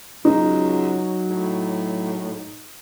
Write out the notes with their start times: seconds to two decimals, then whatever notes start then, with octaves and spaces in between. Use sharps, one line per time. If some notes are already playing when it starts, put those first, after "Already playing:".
0.25 C#2 F#3 D#4
1.28 A2